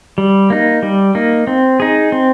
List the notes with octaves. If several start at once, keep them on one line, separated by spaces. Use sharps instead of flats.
G3
A#3 D#4
G3
A#3 D#4
C4
D#4 G#4
C4